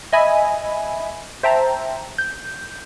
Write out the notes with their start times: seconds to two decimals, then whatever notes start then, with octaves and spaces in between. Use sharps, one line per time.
0.13 D#5 E5 G#5 B5
1.43 C5 E5 G5 A5 A#5
2.18 G6